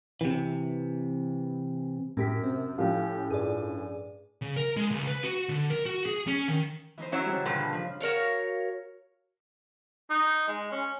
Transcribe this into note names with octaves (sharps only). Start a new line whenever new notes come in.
C3 E3
F#2 A2 G4 B6
C3 C4
A2 F3 C#4 G4 F5
G2 G#4 D5
C#3
A#4
G#3
C#2
B4
F#4
D3
A#4
F#4
G#4
C#4
D#3
E3 D#4 C5
F#3 C#4 E4 C#5
C#3 G3
G2 A#2 D3
F3 B4 F5
F#4 A#4 C#5 F5
D#4
G#3
C#4